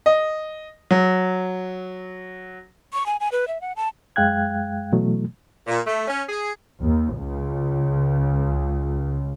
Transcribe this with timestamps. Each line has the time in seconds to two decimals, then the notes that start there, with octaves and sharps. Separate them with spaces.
0.06 D#5
0.91 F#3
2.93 C#6
3.06 G#5
3.20 G#5
3.32 B4
3.48 E5
3.61 F#5
3.76 A5
4.16 F#2 G#3 F5 G5 F#6 G#6
4.93 B2 E3 F#3 A3
5.66 A#2
5.87 A3
6.08 C#4
6.29 G#4
6.82 D#2
7.19 C#2